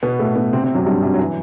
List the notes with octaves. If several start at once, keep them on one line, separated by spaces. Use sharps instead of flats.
B2 B3
A2 A3
B2 B3
C3 C4
C3 C4
F#2 F#3
G2 G3
F#2 F#3
F#3
E3